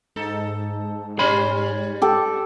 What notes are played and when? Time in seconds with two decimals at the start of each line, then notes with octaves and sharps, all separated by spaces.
0.16 G#2 D#4 A4
1.19 G3 C#4 C#5 B5 C6
2.02 G4 A4